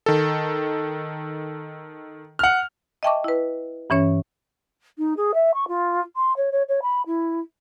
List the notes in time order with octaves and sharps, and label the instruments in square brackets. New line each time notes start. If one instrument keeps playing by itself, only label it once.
[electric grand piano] D#3 A4
[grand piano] F#5 F6
[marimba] D#5 E5 G5 A5 C#6 D6
E4 B4
G2 E3 C#4 C#5
[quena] D#4
G#4
E5
C#6
F4
C6
C#5
C#5
C#5
B5
E4